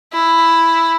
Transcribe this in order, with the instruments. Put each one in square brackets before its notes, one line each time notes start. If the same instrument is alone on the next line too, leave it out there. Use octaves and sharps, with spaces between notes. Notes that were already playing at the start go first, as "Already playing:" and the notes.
[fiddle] E4